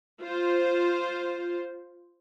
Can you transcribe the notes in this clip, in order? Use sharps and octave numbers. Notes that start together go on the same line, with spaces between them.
F4 C5